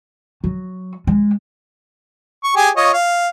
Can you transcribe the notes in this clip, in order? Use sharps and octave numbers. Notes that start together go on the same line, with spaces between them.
F#3
G#3
C#6
G4 G#4 G#5
F4 C#5 D#5
F5